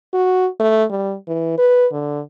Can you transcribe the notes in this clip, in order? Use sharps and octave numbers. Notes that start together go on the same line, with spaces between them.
F#4
A3
G3
E3
B4
D3